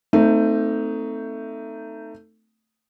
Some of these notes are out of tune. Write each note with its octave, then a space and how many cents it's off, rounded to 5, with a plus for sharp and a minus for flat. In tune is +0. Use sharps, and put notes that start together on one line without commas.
A3 +20 C4 -20 D#4 +0